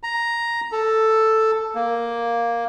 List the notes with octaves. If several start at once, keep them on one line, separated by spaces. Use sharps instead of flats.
A#5
A4
A#3